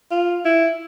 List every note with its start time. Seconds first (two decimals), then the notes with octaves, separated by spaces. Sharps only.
0.11 F4
0.45 E4